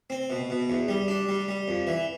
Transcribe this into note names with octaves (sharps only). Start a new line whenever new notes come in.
C4
B2
B2
E2
G3
D4
G3
G3
F2
E3